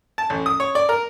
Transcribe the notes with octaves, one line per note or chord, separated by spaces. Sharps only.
A5
A1
D#6
C#5
D5
A#4